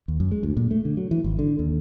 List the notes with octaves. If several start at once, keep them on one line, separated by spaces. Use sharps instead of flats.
D#2
F#2
G#3
D2
A#2
A3
D3
F#3
E3
G#1
D3
D#2